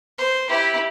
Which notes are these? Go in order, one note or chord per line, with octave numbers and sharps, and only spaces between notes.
C5
E4 G4